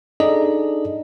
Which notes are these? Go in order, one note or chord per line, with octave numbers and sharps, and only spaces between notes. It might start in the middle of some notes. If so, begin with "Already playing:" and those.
D4 D#4 G#4 A4 D5 D#5